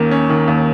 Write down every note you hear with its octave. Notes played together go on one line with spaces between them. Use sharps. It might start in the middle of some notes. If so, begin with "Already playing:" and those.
Already playing: D#2 D#3 A#3 C#4
C#4
D#3
D#2